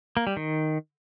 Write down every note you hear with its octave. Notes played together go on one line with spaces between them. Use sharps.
A#3
G3
D#3